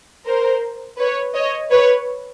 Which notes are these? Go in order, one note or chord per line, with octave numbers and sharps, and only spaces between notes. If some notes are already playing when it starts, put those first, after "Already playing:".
A#4 C5
B4 C#5
C#5 D#5
B4 C#5